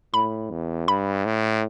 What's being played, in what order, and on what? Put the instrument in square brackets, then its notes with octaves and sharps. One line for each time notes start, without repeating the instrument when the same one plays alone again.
[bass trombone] A2 [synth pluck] B5
[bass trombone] E2
[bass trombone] G2 [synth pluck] B5
[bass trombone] A2